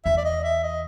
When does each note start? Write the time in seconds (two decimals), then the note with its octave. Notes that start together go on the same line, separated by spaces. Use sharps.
0.05 E2 E5
0.17 D5
0.25 D#5
0.44 E5
0.63 D#5